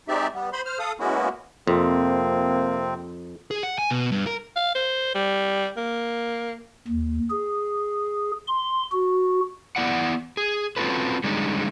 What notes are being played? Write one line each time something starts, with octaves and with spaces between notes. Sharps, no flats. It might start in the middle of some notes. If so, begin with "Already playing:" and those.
G#3 C4 D#4 G4 D5 E5
G3 B3
C5 B5 C6
C5 F6
A4 F5 D#6
G#3 A#3 B3 C#4 E4 F#4
F2 C3 A#3 C4
G#4
F#5
G#5
B2
G2
A#4
F5
C5
G3
A#3
D#2
G#4
C6
F#4
B3 E4 D5 F#5
G#4
C4 C#4 F4 F#4 A4 B4
D3 G3 G#3 C#4 D#4